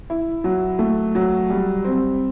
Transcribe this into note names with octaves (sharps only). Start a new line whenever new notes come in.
E4
F#3
A3
F#3
G3
C4